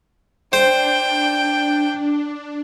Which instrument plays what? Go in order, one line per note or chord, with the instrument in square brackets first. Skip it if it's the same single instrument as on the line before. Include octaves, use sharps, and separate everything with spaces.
[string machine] D4 [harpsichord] C5 [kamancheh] G5